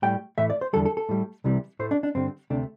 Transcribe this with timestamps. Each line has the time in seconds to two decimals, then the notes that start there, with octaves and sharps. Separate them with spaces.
0.02 A2 G3 G5
0.38 A2 E3 A3 E5
0.50 D5
0.61 C5
0.73 E2 D3 G3 A4
0.86 A4
0.97 A4
1.09 A2 G3
1.44 C2 C3 E3 G3
1.79 A2 A3 C5
1.91 D4
2.03 D4
2.15 G2 D3 G3 C4
2.50 D2 C3 A3 D4